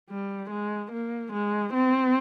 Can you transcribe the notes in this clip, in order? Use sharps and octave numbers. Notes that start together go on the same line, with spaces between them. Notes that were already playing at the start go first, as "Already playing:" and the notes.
G3
G#3
A#3
G#3
C4